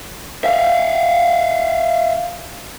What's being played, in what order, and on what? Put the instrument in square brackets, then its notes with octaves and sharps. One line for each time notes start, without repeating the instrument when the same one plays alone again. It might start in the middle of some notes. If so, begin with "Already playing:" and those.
[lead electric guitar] E5 F5